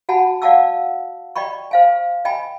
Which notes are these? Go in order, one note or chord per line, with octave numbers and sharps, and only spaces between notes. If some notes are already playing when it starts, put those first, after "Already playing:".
F#4 F#5 G#5 A5 B5
D5 F5 F#5 A5 D6 E6
D5 D#5 G5 B5 C#6
C5 F5 G#5
D#5 G5 G#5 B5